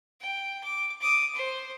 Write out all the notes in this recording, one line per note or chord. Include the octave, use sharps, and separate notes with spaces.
G5
D6
D6 D#6
C5